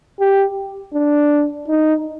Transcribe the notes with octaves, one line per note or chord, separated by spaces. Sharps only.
G4
D4
D#4